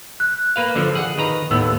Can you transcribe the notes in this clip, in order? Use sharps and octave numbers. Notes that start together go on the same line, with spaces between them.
F#6
A#3 B4 F5
D3 F3
G#4 F#5 F#7
D#3 B4 A#5
D#2 A2 B3 E6